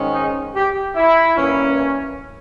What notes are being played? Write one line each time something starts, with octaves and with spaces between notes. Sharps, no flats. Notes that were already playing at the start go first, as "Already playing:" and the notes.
Already playing: G#2 D#3 G#3 C#4
D#4
G4
E4
G2 E3 A#3 C#4